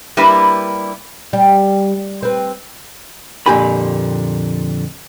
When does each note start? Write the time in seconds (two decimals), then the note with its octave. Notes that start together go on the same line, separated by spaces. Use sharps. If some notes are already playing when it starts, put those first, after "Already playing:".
0.17 G3 A#3 D4 E4 G4 B4
1.33 G3
2.23 C4 B4
3.46 F2 A#2 D3 G4 G#5 B5